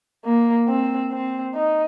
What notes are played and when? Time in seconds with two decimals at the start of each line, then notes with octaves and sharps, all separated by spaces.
0.25 A#3
0.68 C4
1.12 C4
1.55 D#4